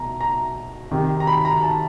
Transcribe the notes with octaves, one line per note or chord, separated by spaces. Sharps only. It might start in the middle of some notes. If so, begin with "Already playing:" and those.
Already playing: B2 A#5
A#5
C3 D#3
A#5
B5
A#5
A5